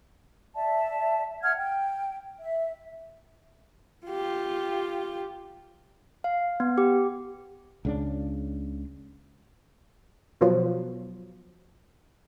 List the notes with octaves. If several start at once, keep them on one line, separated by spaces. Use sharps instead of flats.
D5 E5 A5
E5 F#5 F6 G#6
G5
E5
F4 G4
F5
B3
G4
C#2 C#3 D4
B2 F3 F#3